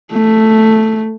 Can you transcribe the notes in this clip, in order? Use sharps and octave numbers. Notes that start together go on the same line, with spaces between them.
A3